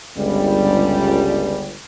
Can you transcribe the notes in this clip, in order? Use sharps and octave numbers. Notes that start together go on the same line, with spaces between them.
G1 C#2 G3